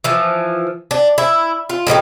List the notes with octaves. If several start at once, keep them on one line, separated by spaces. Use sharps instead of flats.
E3 F3
D4
E4
F4
A2 F3 D#4 G4